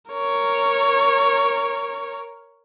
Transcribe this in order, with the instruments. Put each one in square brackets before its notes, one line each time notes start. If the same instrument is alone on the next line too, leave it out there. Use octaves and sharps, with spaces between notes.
[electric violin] A#4 C#5